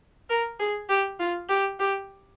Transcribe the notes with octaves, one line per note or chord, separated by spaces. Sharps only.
A#4
G#4
G4
F4
G4
G4